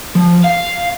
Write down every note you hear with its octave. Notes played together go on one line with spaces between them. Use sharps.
F3
F5